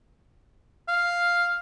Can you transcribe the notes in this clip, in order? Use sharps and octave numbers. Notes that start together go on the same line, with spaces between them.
F5